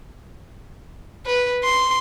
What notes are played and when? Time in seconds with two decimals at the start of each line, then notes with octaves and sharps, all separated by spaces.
1.26 B4
1.64 C6